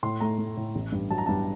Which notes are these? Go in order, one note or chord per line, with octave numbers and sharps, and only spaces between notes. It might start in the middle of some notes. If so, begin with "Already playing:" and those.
A2 C6
A3 A#5
A3
A2
A1
G2
F#3 A5
A#5
G2 A5